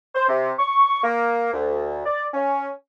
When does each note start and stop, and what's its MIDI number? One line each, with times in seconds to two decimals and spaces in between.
0.15 0.25 72
0.29 0.52 48
0.59 1.01 85
1.04 1.52 58
1.53 2.02 38
2.06 2.25 74
2.34 2.70 61